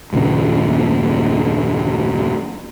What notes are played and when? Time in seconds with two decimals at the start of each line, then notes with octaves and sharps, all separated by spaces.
0.13 F#1 D#2 A#2 C#3